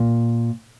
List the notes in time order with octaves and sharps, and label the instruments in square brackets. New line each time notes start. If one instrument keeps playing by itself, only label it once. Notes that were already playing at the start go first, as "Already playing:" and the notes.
Already playing: [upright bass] A#2